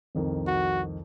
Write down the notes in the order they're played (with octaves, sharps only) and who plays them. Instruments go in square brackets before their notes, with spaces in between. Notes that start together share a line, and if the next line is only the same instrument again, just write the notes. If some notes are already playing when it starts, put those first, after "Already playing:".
[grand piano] C2 F2 D#3
[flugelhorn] F#4